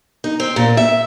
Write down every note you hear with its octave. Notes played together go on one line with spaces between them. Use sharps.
D#4
C4
A#2
E5